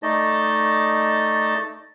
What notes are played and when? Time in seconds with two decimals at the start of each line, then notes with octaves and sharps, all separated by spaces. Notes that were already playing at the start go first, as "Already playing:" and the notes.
0.03 A3 D#4 D5 D#5 A5